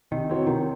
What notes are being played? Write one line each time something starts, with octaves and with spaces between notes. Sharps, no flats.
C3 D#3
E3 C4 F#4 C#5
C3 D#3